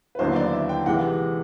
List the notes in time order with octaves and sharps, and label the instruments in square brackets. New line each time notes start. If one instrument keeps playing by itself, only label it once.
[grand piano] B4
[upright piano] D#2 D3 F#3 B3 E4 [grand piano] C5
[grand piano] D5
E5
G5
[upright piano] C3 E3 G#3 [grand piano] F#5